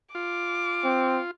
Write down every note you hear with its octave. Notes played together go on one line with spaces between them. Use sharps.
F4 D6
C4